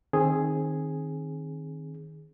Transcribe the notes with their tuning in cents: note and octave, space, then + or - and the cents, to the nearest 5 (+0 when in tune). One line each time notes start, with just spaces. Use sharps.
D#3 +0 C4 +25 G#4 +0